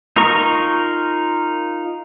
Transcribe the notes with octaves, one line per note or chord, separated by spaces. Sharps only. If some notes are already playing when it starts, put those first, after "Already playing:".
D#4 F4 A#4 A#5 C#6